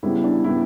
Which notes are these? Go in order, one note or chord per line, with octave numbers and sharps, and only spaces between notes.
C#3 G3 B3 E4
D4
C#3 G3 B3 E4